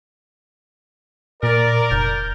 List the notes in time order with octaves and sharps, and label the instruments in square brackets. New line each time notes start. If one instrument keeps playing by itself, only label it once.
[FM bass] A#2 [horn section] A#4 [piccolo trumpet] D5
[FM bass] F1 [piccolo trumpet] G6